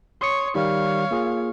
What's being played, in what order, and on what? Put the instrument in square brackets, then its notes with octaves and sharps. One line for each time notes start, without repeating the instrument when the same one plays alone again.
[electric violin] C#5 [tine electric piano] C6 D#6 C#7
[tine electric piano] D#3 G3 [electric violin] C#5 F5
[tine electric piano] A#3 F4 G#4